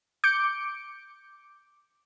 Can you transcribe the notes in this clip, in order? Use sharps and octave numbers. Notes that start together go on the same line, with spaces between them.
D6 G6 C#7 D7